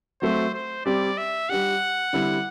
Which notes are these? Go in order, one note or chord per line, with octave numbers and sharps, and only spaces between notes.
F#3 A3 C4 C5
C5
G3 C4 G4 D5
E5
G3 D4 G4 F#5
D3 G3 C4 E4